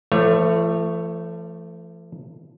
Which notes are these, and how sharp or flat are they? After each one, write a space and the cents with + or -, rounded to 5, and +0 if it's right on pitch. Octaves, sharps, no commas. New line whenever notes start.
F3 -45 A3 +10 C#5 +0